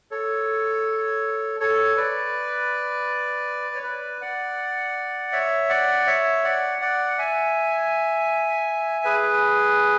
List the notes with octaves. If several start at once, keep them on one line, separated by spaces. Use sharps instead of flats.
A4 C#5
A4 C#5
B4 D5
C#5
B4 D5
D5 F#5
C#5 E5
D5 F#5
C#5 E5
D5 F#5
D5 F#5
E5 G#5
G#4 B4